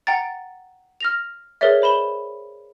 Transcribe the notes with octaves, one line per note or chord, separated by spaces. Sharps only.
F#5 G5 A#5 A6
F6 A#6 F7
G#4 A#4 B4 C#5 D5 E5
C5 B5 E7 G7